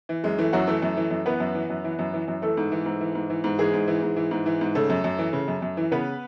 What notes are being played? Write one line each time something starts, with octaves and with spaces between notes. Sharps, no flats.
E3
F#2 G#3
E3 A3
F#2 F#3 F#4
E3 A3 A4
F#2
E3
F#2
E3 B3 B4
F#2
E3
F#2
E3
F#2
E3
F#2
E3 A3 A4
G#2
E3
G#2
E3
G#2
E3
G#2
E3 G#3 G#4
G#2
E3
G#2
E3
G#2
E3
G#2
C#3 A3 A4
F#2
F#2
E3
C#3
F#2
F#2
E3
C#3 B3 B4